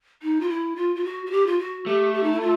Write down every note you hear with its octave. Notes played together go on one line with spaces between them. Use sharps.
D#4
F4
E4
F4
F4
F#4
F#4
G4
F4
F#4
A3 G4
G4
D#4
E4
F4